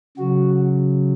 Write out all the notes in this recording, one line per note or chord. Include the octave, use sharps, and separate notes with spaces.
C#3 F#3 F#4